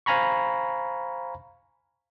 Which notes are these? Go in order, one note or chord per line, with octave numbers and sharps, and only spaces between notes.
C5 F5 G#5 A#5 B5 C#6